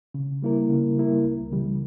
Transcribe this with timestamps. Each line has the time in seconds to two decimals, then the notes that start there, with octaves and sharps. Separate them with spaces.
0.14 C#3
0.42 G3 A#3 E4 A#4
0.70 C#3
0.97 G3 A#3 E4 A#4
1.24 C#2
1.52 C#3 E3 G3